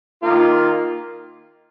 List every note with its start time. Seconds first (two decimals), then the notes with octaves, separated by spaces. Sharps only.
0.22 D#3 A#3 F4